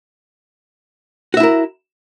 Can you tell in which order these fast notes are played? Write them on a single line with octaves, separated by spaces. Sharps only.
F#4 E5 E4 A#4